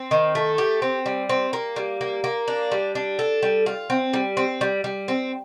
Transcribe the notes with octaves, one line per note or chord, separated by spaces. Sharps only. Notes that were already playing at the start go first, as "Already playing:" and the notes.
Already playing: C4
D#3
A3
G4
C4
G3
C4
A#3
G3
A#3
A#3
D4
G3
D4
A4
G3
F4
C4
G3
C4
G3
G3
C4